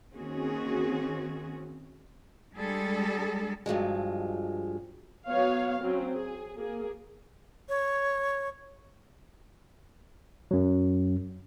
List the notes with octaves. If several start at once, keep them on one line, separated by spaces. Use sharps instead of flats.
D#3 A#3 C4 C#4 F#4 G#4
G3 G#3 D4 G#4 A4
G2 F3 F#3 G#3
F#3 B3 C#5 F5
F#3 C4 C#4
G#4
A#3 G#4
C#5
F#2 F#3